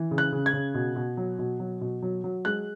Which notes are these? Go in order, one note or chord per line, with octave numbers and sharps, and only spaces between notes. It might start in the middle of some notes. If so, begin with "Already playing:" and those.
Already playing: E3
C#3
F#6
C#3
G#6
C#3
B2
B2
F#3
B2
F#3
B2
F#3
F#3
G#3 F#6